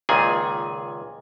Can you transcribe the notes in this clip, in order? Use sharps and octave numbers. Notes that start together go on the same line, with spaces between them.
C#2 A#2 D#3 G#4 G#5